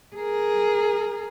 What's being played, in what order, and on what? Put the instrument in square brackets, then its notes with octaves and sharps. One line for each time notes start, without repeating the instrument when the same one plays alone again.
[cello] G#4 A#4